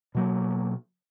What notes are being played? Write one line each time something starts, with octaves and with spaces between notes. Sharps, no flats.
B2 F#3 A#3